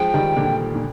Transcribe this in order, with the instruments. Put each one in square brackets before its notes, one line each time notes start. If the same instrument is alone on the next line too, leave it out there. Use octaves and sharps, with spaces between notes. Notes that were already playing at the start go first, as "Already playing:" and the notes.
Already playing: [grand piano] F3 G#3 [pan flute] G5
[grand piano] D#3 G3
A#2 D3
A#2